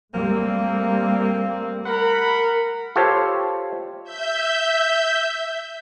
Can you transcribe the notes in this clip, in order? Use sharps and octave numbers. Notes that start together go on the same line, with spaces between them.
G3 A3 A#3 C4
A#4 F#5 B5
F4 G4 A4 C5 C#5
E5 G6